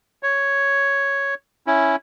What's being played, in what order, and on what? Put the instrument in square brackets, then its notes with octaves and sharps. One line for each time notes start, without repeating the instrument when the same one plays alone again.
[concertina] C#5
C#4 E4